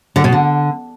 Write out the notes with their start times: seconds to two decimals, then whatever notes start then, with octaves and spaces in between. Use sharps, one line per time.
0.16 D3
0.24 B2
0.32 D3